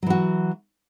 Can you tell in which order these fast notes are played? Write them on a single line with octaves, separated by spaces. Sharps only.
F#3 E3 F#4